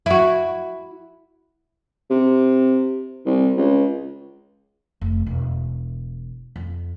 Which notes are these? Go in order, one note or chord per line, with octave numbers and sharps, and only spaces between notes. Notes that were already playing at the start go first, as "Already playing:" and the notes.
E4 F#4
C3
C2
C#2
F1
E1
F2